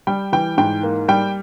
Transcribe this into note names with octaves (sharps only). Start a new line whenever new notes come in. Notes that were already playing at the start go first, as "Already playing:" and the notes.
G3 G5
E3 G5
G#2 G5
A#3
G3 G5